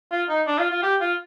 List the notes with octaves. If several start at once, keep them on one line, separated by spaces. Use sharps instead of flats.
F4
D#4
D4
F4
F4
G4
F4